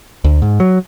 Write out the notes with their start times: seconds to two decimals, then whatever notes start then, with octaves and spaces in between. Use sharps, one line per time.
0.24 D2
0.42 G#2
0.60 F#3